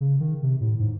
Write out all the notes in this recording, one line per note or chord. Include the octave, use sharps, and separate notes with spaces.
C#3
D#3
C3
A2
G#2